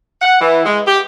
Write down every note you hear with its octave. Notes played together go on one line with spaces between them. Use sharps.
F#5
E3
G#3
G4